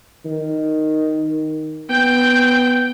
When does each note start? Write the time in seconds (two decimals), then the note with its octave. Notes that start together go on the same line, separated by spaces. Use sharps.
0.25 D#3
1.90 B3 G5 G6